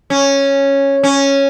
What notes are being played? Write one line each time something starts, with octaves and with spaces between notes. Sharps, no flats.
C#4
C#4